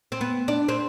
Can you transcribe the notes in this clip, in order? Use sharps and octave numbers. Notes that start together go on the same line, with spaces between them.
C4
B3
D4
C4